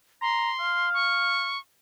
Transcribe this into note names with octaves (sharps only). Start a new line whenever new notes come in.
A#5 C6
F5
C#6